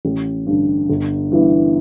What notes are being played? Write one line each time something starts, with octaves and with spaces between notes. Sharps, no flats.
A1
G2 D3
G1
G2 E3 B3 E4